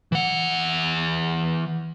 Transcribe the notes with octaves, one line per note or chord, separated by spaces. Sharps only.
E3 F#5